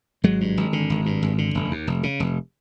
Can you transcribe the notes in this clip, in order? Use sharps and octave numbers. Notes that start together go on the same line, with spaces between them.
G#1 F#3 G#3
G2
G#1
D3
G#1
G2
G#1
D3
F1
D#2
F1
C#3
F1